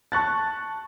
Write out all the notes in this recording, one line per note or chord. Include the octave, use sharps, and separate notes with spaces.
A5 C#6 F#6 A6